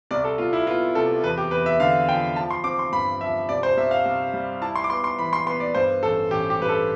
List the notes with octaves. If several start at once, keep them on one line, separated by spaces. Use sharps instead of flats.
C2 D5
A4
C2 F4
E4
B3 F4
C3 A4
E2 B4
G4
E2 B4
E5
D3 F5
F3 G5
F3 A5
C6
C4 D6
C6
G2 B5
F3 E5
C3 D5
C5
C2 E5
F5
C2
G3
E4 A5
C6
D6
B3 C6
C6
E3 B5
C6
B3 C6
D5
G2 C5
A1 A4
A1 G4
G4
G2 B4
A4